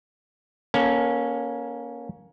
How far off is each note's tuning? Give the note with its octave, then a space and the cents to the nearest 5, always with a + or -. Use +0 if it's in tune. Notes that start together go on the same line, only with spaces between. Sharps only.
A#3 +25 C#4 +0 A4 +0